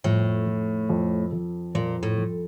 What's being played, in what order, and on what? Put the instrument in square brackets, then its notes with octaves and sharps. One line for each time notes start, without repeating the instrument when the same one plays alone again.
[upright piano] F2 [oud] A2
[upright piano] F2
F2
F2
[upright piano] F2 [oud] A#2
[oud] A2
[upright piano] F2